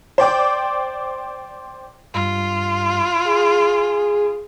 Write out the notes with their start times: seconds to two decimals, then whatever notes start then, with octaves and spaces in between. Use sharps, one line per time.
0.18 C5 D5 G5 D6
2.14 G2 F4
3.25 G#4